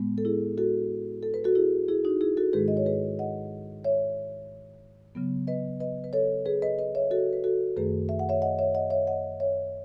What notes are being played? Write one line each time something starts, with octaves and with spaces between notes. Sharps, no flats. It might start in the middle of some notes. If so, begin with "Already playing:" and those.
Already playing: A2 G#3 B3
A4
E4 G#4
F#4 A4
A4
B4
F#4 A4
E4 G#4
E4 G#4
D#4 F#4
E4 G#4
F#4 A4
G#2 D#3 G#3 G#4 B4
D#5
C#5
G#4 B4
D#5 F#5
C#5 E5
C#3 F#3 B3
B4 D#5
B4 D#5
B4
A4 C#5
G#4 B4
B4 D#5
B4 D#5
C#5 E5
F#4 A4
B4
F#4 A4
F#2 D#3 A3 G#4 B4
E5
F#5
C#5 E5
D#5 F#5
C#5 E5
D#5 F#5
C#5 E5
D#5 F#5
C#5 E5